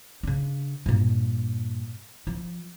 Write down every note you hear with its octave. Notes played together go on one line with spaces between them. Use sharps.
C#3 D4
G2 A#2
F3